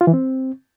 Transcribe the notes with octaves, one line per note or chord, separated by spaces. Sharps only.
F4
E3
C4